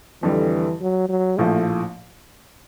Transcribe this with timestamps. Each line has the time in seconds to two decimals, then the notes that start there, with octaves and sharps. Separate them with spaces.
0.23 F2 D3 E3 G3
0.81 F#3
1.09 F#3
1.38 A#1 A2 F3 A3